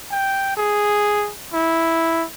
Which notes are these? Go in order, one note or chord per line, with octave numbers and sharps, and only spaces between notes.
G5
G#4
E4